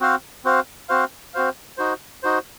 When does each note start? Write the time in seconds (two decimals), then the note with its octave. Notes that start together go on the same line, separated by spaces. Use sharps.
0.01 C4 F#4 C5 F5
0.45 C4 F#4 C5 F5
0.89 C4 F#4 C5 F5
1.34 C4 F#4 C5 F5
1.78 D#4 F#4 C5
2.23 D#4 F#4 C5